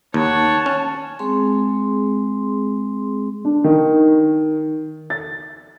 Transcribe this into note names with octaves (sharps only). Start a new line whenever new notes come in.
D#2 C#5 F#5 A5
C#4
G#3 C4 G#4 C6
D4
D#3
A6